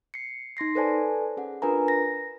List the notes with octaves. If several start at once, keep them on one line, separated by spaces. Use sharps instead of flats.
C7 C#7
D#4 C6 A#6 C7
A4 B4 C5 D5 G#5 A5
C#4 G#4 F#5
D4 F4 A#4 B4 G#5 A#5
A#6